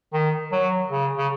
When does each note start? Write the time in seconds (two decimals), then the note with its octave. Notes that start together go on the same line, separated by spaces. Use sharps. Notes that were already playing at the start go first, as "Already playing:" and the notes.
0.13 D#3
0.52 F#3
0.90 C#3
1.17 C#3